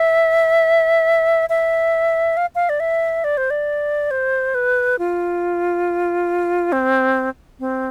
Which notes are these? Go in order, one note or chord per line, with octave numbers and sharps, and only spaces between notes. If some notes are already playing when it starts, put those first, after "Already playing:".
Already playing: E5
E5
F5
F5
D5
E5
D5
C5
D5
C5
B4
F4
C4
C4